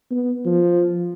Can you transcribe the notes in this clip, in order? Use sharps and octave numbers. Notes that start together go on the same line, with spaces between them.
B3
F3